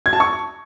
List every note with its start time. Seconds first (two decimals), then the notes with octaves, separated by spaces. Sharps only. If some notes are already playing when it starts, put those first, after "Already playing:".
0.06 G#6
0.13 A5
0.20 C#6